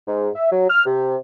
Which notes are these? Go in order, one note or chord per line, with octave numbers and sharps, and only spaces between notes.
G#2
E5
F#3
F6
C3